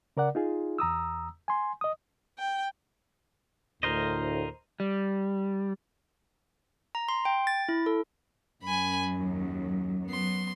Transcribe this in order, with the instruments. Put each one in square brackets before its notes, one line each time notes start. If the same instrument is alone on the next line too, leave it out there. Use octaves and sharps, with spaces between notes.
[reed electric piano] C#3 A#4 D5 F#5
D#4 F4 G#4
E2 A#5 D#6 E6
G#5 C6
D#5 D#6
[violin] G5
[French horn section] D2 A2 [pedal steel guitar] A#4 C5 D#5
[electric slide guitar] G3
[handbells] A#5
C6
G5
A6
E4
A4
[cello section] F#2 F#3 [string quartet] G#5 B5
[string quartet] D#2
[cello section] F#3 [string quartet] B3 C6